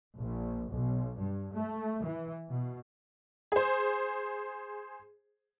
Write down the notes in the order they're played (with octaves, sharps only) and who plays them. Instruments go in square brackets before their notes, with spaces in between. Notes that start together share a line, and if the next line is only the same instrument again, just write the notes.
[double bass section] A#1
B1
G2
A3
E3
B2
[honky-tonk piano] G#4 C5